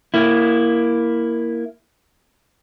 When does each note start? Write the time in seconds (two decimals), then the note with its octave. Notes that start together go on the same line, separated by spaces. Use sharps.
0.14 A#3 E4